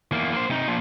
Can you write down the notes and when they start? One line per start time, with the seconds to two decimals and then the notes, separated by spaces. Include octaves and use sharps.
0.12 E2 A#3
0.33 A#3 C5
0.50 C3 D#4
0.68 A#2 F3